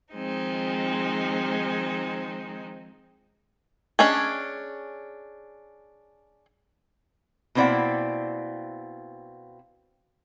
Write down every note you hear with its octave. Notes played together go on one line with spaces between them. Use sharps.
D#3 F3 G#3 C4 D#4
C#4 D4 G#4 D#5 G#5
B2 A#3 C4 E4 D5 F#5